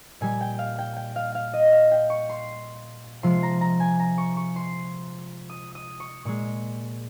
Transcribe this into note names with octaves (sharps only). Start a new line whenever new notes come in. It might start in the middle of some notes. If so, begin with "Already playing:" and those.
A#2 G3 G#5
G5
F5
G5
G5
F5
F5
D#5
F5
G5
C#6
C6
C3 F3 G#3 C6
A#5
A#5
G#5
A#5
C#6
C#6
C6
D#6
D#6
C#6
A#2 G#3 C#6